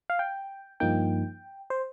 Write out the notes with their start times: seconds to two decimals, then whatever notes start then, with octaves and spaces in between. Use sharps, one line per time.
0.10 F5
0.19 G5
0.80 G2 F3 A#3 D#4 G5
1.70 C5